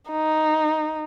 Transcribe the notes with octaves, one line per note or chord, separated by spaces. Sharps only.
D#4